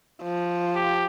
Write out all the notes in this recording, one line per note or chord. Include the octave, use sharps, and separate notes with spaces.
F3
G4